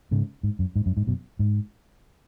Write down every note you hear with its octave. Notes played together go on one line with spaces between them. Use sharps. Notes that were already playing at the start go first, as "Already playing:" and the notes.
G#2 C#3
G#2
F#2
G#2
F#2
G#2
F#2 B2
G#2